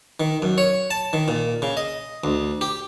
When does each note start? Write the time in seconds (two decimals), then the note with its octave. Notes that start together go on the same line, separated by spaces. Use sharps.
0.20 D#3
0.42 F#2
0.58 C#5
0.91 A5
1.13 D#3
1.28 A#2
1.62 C#3
1.77 D#5
2.24 D2
2.61 G4